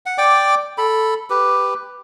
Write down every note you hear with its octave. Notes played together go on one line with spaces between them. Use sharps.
F#5
D5 G5 D6
A4 B5
G4 B4